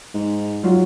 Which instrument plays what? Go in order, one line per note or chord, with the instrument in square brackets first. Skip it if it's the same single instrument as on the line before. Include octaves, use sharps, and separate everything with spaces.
[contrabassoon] G#2
[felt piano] F#3 F4